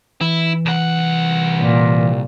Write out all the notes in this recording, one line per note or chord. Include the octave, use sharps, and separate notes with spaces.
E3 E4
C2 F#5
A#2